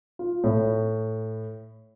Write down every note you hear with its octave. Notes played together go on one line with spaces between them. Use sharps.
F4
A2